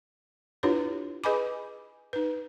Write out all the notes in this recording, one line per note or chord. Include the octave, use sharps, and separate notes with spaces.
D4 E4 F4 G4 B4 C#5
G#4 B4 D#5 G#5 B5 D6
D#4 B4